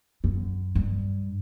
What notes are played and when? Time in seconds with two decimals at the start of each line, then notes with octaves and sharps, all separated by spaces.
0.24 F#2
0.75 G2